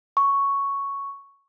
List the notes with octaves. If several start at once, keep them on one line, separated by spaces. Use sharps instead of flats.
C#6